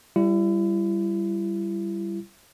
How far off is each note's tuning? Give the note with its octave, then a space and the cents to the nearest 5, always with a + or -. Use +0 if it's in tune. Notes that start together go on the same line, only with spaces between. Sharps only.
G3 +0 E4 +35